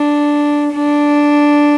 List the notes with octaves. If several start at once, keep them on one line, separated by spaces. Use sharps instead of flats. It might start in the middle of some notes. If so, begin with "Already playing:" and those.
Already playing: D4
D4